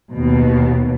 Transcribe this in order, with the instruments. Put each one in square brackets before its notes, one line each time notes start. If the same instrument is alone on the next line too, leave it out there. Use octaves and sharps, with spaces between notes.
[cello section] D#2 B2